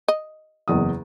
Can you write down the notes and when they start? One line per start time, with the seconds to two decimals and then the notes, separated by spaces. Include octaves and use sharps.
0.08 D#5
0.68 F#1 E2 D#6